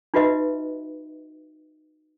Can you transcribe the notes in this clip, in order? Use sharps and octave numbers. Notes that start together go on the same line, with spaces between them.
D#4 F4 F#4 B4 D#5 E5